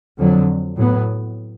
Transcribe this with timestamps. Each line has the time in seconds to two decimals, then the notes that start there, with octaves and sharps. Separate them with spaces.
0.19 F2 D3 F#3
0.76 A2 F#3 B3